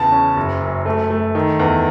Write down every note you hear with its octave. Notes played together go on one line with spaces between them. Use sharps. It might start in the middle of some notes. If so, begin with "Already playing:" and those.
Already playing: E2 C#3 A5
C#4
F#1
F#2
A3
A3
D#3
E2